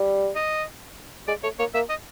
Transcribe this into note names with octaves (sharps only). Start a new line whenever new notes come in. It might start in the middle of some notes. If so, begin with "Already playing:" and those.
Already playing: G3
D#5
G#3 D5
A3 C#5
A#3 C#5
A#3 E5
D#5